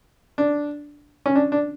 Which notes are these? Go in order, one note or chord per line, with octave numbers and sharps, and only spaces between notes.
D4
C#4
D4
D4